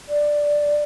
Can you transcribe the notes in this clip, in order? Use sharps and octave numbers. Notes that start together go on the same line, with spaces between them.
D5